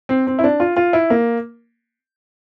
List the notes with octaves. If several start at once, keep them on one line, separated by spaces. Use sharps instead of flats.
C4
C4
E4
D4
F4
F4
E4
A#3